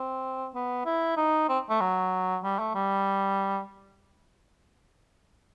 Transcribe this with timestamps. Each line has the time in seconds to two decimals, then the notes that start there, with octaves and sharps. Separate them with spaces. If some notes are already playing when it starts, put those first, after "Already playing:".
Already playing: C4
0.55 B3
0.86 E4
1.17 D#4
1.49 C4
1.70 A3
1.81 F#3
2.44 G3
2.59 A3
2.75 G3